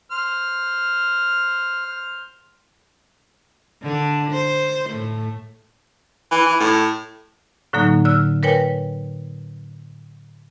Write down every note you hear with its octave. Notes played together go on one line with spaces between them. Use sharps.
C5 F6
D3 D4
C5
A2 A3
E3
E3
A2
A2 D3 F#3 A#3 D#4
D3 E6 F6
A#4 B4 C#5 G5 G#5